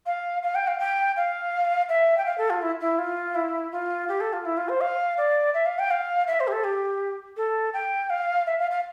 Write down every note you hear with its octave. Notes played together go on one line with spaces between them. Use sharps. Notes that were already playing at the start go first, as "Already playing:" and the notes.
F5
F5
G5
F5
G5
F5
E5
G5
F5
A4
F4
E4
E4
F4
E4
F4
G4
A4
F4
E4
F4
C5
F5
D5
E5
F5
G5
F5
E5
C5
G4
A4
G4
A4
G5
F5
E5
F5
F5